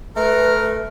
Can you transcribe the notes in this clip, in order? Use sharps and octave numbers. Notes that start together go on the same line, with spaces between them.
A3 A#4 B4